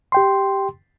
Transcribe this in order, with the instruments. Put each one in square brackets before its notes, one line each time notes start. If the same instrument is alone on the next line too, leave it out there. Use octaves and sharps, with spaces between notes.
[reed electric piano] G4 G5 C6